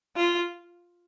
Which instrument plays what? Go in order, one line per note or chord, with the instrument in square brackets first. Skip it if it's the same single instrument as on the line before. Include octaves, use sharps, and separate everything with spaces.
[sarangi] F4